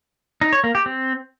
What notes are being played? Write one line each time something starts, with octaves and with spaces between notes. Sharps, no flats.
D#4
C#5
A#3
G4
C4